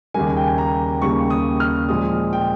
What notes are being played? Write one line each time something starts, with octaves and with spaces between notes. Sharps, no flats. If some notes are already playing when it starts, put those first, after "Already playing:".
D#2 C#3 G3 A#3 G#5
G5
G#5
A#5
D#2 C#3 G3 A#3 C#6
D#6
F6
A#2 F3 G#3 D#6
G5